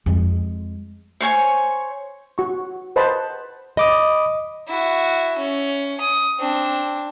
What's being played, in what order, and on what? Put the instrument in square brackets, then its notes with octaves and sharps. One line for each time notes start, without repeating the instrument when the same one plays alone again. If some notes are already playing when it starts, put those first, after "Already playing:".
[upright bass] F2 G#3
[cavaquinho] C5 C#5 G#5 C#6
[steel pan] F#4 C#6
B4 C5 D#5 F#5 A5 B5
[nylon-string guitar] D#5 [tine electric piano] B5 D6 D#6
[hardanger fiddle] E4 F#4
C#4
D#6
C4 D4